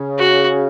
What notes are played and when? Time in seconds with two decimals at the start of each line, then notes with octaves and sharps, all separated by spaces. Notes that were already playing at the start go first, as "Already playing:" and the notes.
Already playing: C#3
0.18 F#4